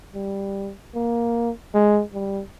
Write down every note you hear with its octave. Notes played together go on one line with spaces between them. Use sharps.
G3
A#3
G#3
G3